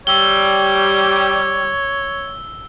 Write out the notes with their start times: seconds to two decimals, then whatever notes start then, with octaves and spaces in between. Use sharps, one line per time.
0.07 G3 C#5 E6 G7